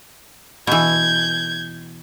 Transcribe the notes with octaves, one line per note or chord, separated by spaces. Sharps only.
B2 E3 G6 G#6